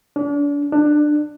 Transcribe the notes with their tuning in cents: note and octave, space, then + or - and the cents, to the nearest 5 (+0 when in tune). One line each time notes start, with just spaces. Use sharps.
D4 -35
D4 +20